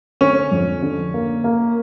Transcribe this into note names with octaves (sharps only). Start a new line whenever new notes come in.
D3 C#4
F2
D3
A#3
A#3